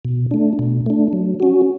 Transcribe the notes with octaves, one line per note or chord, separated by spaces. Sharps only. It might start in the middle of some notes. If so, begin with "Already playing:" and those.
B2
A3 D4
B2
A3 D4
F#3
C#4 F#4